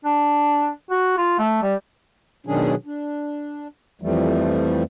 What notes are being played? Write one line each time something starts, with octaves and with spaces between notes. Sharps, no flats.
D4
F#4
F4
A3
G3
B2 D#3 F#3 C#4 D4 G#4
D4
F2 E3 F3 G3 A3